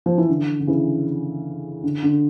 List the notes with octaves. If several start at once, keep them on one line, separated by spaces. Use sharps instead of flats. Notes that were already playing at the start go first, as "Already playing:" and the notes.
F3
E3
D3
D3
C#3 E3
D3
D3